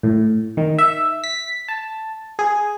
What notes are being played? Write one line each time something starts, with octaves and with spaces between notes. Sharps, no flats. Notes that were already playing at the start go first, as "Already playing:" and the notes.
A2
D#3
E5
B6
A5
G#4